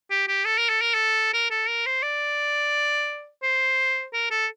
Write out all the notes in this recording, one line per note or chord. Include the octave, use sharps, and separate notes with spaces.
G4
G4
A4
A#4
A4
A#4
A4
A#4
A4
A#4
C5
D5
C5
A#4
A4